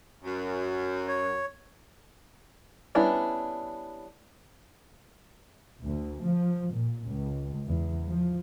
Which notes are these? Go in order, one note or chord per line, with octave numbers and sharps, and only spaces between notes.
F#2
C#5
G3 B3 C#4 D4 E4
D2
F3
A#2
C#2
E2
F3